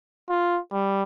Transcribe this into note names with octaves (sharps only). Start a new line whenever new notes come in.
F4
G3